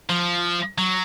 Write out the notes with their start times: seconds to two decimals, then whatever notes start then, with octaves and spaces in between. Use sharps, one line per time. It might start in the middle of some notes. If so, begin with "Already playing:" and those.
0.09 F3
0.78 F#3